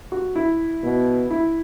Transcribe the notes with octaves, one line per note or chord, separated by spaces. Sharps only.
F#4
E4
B2
E4